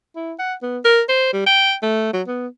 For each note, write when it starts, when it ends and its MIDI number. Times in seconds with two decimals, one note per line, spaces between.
0.16 0.33 64
0.39 0.54 78
0.62 0.79 59
0.85 1.02 70
1.09 1.30 72
1.33 1.45 55
1.47 1.74 79
1.83 2.12 57
2.13 2.22 54
2.27 2.47 59